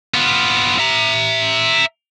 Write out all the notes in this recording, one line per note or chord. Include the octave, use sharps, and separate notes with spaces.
B3 F4
E5 A#5